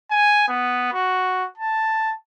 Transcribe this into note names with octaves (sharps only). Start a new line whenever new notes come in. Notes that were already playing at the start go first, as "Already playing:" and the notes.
G#5
B3
F#4
A5